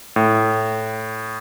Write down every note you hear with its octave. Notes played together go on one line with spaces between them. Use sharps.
A2